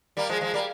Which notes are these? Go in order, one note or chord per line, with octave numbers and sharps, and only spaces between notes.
G3 A#3
F3 G#3
F3 G#3
G3 A#3